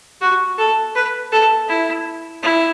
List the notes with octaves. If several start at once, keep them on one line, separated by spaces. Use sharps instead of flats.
F#4
A4
B4
A4
E4
E4